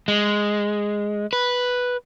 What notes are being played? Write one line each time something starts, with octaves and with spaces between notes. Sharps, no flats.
G#3
B4